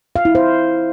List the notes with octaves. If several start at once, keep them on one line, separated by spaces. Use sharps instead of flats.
F5
E4
C5